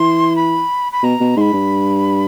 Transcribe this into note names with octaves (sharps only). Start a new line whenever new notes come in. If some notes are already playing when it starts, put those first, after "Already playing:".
Already playing: E3 C6
B5
B5
B2 A#5
B2
G#2 B5 C6
G2